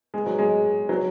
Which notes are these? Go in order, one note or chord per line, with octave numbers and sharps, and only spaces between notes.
G#3
F#3
G#3
F#3